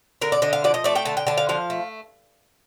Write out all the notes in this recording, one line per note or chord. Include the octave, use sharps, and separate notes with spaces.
D3 A#4
D5
D3 D#5
F5
F3 D5
D#5
A3 D5
G5
D3 A5
G5
D3 A5
F5
F3 F5
A3